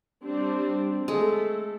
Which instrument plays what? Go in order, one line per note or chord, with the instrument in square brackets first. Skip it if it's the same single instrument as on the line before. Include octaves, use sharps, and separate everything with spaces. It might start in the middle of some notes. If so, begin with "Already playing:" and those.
[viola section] G3 C4 D4
[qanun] G#3 [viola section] A3 A4